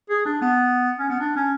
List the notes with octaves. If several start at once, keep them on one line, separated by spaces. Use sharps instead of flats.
G#4
D4
B3
C#4
B3
D4
C#4